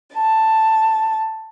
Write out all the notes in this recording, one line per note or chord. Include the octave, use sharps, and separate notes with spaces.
A5